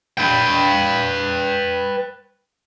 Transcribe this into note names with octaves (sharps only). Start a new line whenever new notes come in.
B4 G5